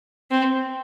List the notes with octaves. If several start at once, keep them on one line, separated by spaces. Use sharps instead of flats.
C4